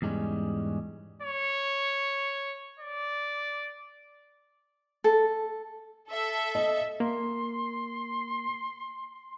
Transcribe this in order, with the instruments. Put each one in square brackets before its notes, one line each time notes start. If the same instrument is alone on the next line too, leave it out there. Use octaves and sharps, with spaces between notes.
[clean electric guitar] E2 G#2 G3 G#3 C#4
[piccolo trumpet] C#5
D5
[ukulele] A4
[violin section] A4 E5
[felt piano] D#5
[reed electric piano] A#3 [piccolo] C6